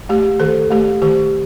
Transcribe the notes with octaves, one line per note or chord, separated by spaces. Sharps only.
A3 G4
D#3 A4
A3 G4
D#3 G4